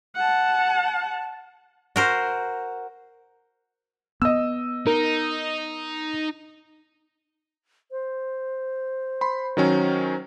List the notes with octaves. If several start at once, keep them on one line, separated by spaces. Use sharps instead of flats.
F#5 A5
F#4 A#4 C5
B3 D#5 E6
D#4 A#4
C5
B5 C6
D#3 F#3 C#4